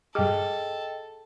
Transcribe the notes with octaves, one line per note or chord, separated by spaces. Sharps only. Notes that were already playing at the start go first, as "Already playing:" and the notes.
G2 G#4 A4 D#5 G5 D6